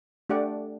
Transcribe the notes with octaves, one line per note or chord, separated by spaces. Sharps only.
A3 D4 G4 D5 F#5